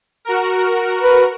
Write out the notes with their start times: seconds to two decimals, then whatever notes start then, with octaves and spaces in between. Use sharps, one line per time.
0.25 F#4 A#4
1.02 B4